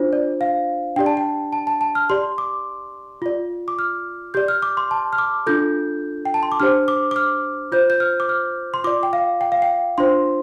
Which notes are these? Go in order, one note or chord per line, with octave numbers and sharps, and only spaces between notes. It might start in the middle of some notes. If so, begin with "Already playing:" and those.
Already playing: D4 F4 C5
D5
F5
D4 G4 D5 G5
A5
G5
A5
A5
A5
F6
G4 D5 C6
D6
F4 D5
D6
F6
G4 D5 G6
F6
D6
C6
A5
F6
D6
D4 F4 A4 G6
G5
A5
C6
D6
D4 G4 C5 F6
D6
D6
F6
F4 C5 G6
G6
F6
D6
F6
C6
F4 D5 D6
G5
F5
G5
F5
G5
D4 F4 C5 C6